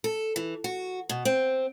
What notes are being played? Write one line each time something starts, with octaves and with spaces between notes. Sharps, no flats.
A4
E3
F#4
B2
C4